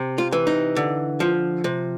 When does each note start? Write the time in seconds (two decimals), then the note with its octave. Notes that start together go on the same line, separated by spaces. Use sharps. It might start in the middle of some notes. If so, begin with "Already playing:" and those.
Already playing: C3
0.18 F4
0.32 E3
0.47 D#4
0.76 D3
1.20 F3
1.64 C3